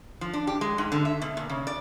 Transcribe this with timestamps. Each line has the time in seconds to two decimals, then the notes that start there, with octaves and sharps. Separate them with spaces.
0.21 F3
0.33 D4
0.47 G4
0.61 G#3
0.78 G#2
0.92 D3
1.05 E5
1.22 B2
1.37 A#2
1.50 C#3
1.67 D5